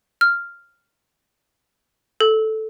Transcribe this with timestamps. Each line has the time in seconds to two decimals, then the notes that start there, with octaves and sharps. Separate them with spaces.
0.21 F6
2.21 A4